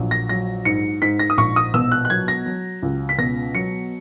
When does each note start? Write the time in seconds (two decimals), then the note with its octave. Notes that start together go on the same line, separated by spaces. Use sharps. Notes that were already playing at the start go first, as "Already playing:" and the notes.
Already playing: A#1 F#3
0.11 A#6
0.29 F#3 A#6
0.65 G#2 C#7
1.02 G#2 B6
1.19 A#6
1.30 D#6
1.38 A#1 C#6
1.56 D#6
1.74 B2 E6
1.92 F#6
2.05 F#6
2.10 F#3 G#6
2.28 A#6
2.46 F#3
2.83 C#2
3.09 B6
3.18 B2 A#6
3.55 F#3 C#7